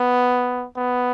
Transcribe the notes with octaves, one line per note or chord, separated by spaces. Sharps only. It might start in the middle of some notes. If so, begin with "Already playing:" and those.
Already playing: B3
B3